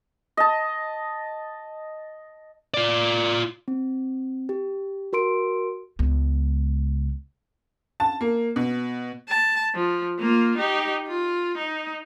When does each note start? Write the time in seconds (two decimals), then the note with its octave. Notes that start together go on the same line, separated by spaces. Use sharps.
0.37 D#5 A5
2.74 F4 D5
3.68 C4
4.49 G4
5.13 F#4 A#4 C6 D7
5.99 C#2 B3
8.00 A5
8.21 A#3
8.56 B2
9.29 A5
9.75 F3
10.19 A#3 F4
10.58 D#4 G4
11.08 F4
11.58 D#4